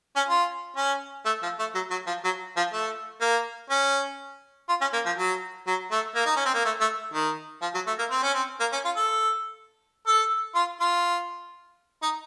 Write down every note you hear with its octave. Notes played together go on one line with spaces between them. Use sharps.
C#4
F4
C#4
A3
F3
A3
F#3
F#3
F3
F#3
F3
A3
A#3
C#4
F4
C#4
A#3
F3
F#3
F#3
A3
A#3
D#4
C#4
C4
A#3
A3
A3
D#3
F3
F#3
A3
A#3
C4
C#4
C4
A#3
C#4
F4
A4
A4
F4
F4
D#4